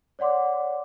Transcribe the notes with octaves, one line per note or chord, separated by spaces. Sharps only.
C#5 D5 F#5 C6 D6